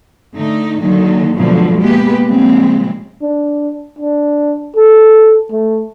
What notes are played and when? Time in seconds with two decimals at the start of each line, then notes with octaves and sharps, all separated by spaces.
0.35 D3 A3 D#4
0.80 D3 D#3 F#3 A#3 D#4
1.36 B2 D3 F3 F#3 G#3 A3
1.80 G#3 A#3 B3 G4 B4
2.27 A#2 C#3 F3 G3 G#3 C4
3.22 D4
3.98 D4
4.76 A4
5.51 A3